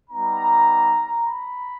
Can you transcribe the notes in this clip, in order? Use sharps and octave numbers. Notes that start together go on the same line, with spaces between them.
G3 B3 D#4 A#5
B5